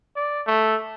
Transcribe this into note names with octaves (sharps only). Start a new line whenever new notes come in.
D5
A3